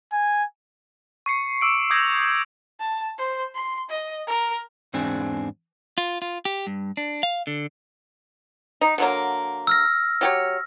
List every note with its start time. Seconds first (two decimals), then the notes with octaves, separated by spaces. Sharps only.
0.13 G#5
1.26 C#6 C7 C#7
1.61 D6 E6 D7
1.90 D6 D#6 G6 G#6 A#6 F#7
2.79 A5
3.18 C5
3.55 C6
3.90 D#5
4.27 A#4
4.94 E2 G#2 C4 D4 G#4
5.98 F4
6.22 F4
6.45 G4
6.67 G2
6.97 D4
7.23 F5
7.47 D3
8.81 D#4
8.98 D3 F#3 A#3
9.67 E6 F6 A#6
10.21 F#3 G4 C#5